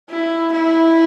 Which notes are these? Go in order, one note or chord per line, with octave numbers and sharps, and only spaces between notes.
E4
E4